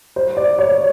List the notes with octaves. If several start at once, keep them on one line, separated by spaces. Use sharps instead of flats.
C5
D5
C#5